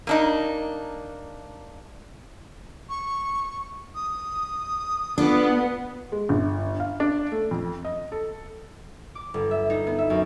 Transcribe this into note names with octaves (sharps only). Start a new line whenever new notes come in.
A#3 D4 D#4
C#6
D#6
B3 D4 F4 A4
G#3
G1
F5
D4
A3
F2
D#5
A4
D6
G1
E5
D#4
B3
E5
F#2